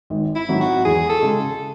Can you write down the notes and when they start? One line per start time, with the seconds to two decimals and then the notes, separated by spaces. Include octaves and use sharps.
0.10 G#1
0.35 E4
0.48 G#2 F#3 C4 D#4
0.61 F#4
0.85 E2 G#4
1.09 A4
1.22 C#3 G#3